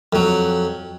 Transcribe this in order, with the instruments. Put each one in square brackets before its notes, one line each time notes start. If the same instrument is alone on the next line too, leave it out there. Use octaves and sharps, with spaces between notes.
[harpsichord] F2 F#3